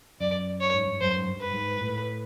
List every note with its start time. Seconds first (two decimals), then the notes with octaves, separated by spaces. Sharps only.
0.21 F#2 D5
0.60 C#5
0.74 G#2
0.87 G2
1.01 F#2 C5
1.16 G#2
1.28 G2
1.41 B4
1.54 G#2
1.81 A2